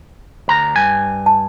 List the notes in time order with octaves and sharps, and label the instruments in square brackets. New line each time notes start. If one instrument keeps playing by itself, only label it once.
[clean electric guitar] D2 A#5
G2 G#5
[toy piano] A5